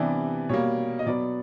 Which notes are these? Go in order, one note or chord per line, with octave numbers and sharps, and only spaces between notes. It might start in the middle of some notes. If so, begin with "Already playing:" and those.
Already playing: C3 E3 G3 B3 D4 D5
B2 G3 A#3 C#5
D#5
B2 F#3 B3 D5